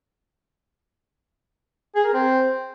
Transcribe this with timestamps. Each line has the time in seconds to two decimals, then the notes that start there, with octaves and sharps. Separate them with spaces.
1.95 G#4
2.05 A#4
2.14 C4